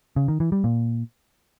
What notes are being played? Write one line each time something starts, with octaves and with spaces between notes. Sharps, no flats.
C#3
D#3
E3
G3
A#2